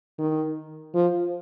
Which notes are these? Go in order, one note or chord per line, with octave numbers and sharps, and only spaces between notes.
D#3
F3